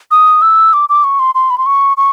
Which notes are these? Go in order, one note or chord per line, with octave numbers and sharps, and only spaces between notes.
D#6
E6
D6
D6
C#6
C6
C6
B5
C6
C#6
C#6